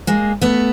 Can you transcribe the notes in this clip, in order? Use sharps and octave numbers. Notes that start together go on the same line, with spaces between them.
G#3 A#3
A3 B3